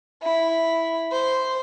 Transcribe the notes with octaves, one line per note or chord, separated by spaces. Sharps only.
E4
C5